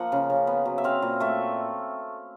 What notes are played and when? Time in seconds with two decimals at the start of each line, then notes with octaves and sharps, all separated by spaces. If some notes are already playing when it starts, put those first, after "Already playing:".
Already playing: F3 A#3 F#5
0.12 C#3
0.30 C#3
0.47 B3
0.65 F#3
0.78 E5
0.84 C4 F5
1.02 A#2
1.20 A3 E5